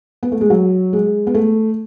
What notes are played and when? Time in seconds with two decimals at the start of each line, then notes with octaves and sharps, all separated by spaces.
0.23 B3
0.32 A3
0.41 G#3
0.50 F#3
0.93 G#3
1.27 B3
1.34 A3